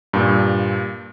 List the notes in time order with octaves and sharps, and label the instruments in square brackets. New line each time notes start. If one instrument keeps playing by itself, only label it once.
[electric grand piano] G2 A#2